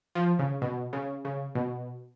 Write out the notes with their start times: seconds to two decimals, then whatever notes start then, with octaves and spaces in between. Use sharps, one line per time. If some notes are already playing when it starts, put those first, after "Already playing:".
0.15 F3
0.39 C#3
0.62 B2
0.93 C#3
1.25 C#3
1.55 B2